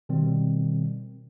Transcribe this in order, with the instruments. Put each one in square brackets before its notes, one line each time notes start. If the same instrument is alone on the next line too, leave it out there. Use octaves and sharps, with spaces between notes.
[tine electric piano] B2 D#3 G3 C4